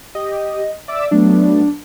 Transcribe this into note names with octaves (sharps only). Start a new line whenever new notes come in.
G4 D#5
D5 E5 D6 E6
F#3 A3 B3 D4